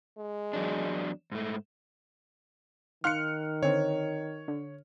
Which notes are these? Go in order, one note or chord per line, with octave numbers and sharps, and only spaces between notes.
G#3
E2 F#3 D4
G#2 A3
D#3 D#4 F5 C6 F6 F#6 C#7
D3 C4 C#5
D3